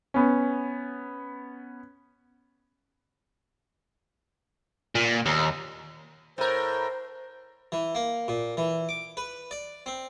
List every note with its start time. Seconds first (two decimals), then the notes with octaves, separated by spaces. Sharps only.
0.14 B3 C#4
4.95 A#2
5.26 D#2
6.38 A2 A#4 C5
7.72 E3
7.95 A#3
8.28 A#2
8.57 E3
8.89 D6
9.17 B4
9.51 D5
9.86 C4